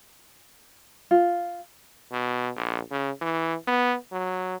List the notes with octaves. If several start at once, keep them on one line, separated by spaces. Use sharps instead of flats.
F4
B2
A#1
C#3
E3
B3
F#3